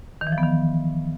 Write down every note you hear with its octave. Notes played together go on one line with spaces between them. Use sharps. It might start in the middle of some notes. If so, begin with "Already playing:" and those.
D#3
E3
F3
B3
D#3